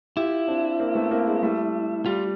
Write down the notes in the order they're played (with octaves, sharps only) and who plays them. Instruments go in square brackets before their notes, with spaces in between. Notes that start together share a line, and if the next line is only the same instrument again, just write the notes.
[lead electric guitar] E4 [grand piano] F4 G4
[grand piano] C4 D4
A#3 C4
A3 B3
A#3 C4
G#3
G3 A3
[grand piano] G3 [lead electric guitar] F4